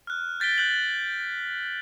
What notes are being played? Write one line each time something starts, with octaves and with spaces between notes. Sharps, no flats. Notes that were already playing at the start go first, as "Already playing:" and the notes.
F6 F#6
G6 A6 B6 D7 G7
F#6 G6 F#7